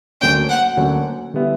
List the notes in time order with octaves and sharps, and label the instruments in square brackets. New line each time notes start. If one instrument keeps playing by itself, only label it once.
[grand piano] D2 D3 F#3 A#3 C#4 [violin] G5
[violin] F#5
[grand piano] D2 D3 F#3 A#3 C#4
D3 G3 B3 E4